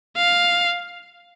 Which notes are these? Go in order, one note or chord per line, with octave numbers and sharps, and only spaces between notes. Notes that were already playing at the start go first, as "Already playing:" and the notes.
F5